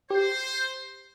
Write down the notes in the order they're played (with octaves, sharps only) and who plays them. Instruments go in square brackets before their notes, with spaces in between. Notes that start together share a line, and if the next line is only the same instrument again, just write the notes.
[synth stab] G4 [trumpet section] C5